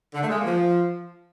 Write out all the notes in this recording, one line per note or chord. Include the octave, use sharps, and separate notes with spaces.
D3
A3
G#3
A#3
F3